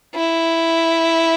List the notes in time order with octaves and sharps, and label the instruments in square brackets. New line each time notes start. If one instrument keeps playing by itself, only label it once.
[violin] E4